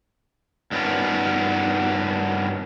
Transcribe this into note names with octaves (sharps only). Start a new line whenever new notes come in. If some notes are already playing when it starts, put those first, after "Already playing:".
G2 D#3 B3 C#4 D4 F4